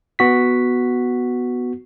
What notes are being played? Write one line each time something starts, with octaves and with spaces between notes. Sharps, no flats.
B3 F#4 B6